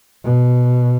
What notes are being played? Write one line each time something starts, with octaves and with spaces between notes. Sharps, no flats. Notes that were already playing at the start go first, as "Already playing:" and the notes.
B2